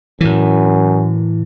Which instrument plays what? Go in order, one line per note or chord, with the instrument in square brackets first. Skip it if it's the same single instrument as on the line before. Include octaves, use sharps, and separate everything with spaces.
[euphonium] F#2 [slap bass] A2 E3